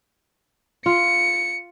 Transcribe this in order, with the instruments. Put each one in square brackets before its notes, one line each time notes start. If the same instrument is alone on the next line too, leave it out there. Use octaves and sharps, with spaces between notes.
[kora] F4 [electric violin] C#7